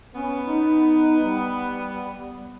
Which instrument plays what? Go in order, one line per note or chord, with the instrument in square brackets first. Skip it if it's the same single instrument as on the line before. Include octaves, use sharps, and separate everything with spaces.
[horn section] B3 [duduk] C#4
[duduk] D#4
G3